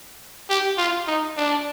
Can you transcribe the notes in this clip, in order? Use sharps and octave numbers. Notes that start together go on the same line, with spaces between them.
G4
F4
D#4
D4